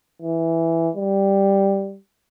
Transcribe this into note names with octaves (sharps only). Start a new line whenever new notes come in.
E3
G3